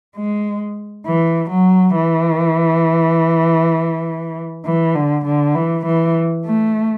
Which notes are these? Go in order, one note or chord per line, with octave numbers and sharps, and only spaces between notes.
G#3
E3
F#3
E3
E3
D3
D3
E3
E3
A3